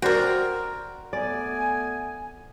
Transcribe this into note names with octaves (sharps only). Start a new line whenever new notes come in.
F#4 A#4 C5 D5 G5
A3 B3 D5 G#5